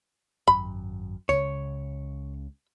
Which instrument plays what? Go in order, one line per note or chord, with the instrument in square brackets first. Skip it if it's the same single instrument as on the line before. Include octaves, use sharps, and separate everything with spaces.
[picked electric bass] G#1 F#2 [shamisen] B5
[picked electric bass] C#2 C#3 [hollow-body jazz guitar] C#5